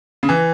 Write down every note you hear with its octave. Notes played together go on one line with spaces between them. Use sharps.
C#3
E3